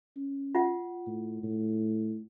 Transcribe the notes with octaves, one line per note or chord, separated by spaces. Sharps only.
C#4
F4 F#5
A2
A2